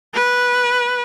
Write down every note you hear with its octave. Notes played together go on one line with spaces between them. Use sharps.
B4